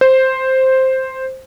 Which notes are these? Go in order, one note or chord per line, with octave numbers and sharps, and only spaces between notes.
C5